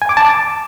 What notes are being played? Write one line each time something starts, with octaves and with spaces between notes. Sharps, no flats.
G#5
D6
A5
D6